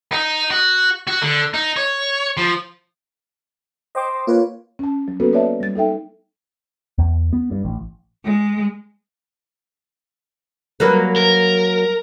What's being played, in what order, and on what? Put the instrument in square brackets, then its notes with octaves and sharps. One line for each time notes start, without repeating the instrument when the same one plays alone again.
[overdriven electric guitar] D#4
F#4
F#4
D3
D#4
C#5
F3
[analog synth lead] C5 [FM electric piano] D#5 G5 D6
[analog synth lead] A#3 [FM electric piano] F4 B4 C#5
[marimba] C#4 A5
F#3
A#3 B3 C#4 F#4 A4 B4
A#3 B4 C#5 D5 E5 A5
G3 A6
D#4 A4 E5 G5
[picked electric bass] E2
B3
G2
A1
[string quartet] G#3
[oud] F#3 A#3 B4
[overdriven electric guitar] A#4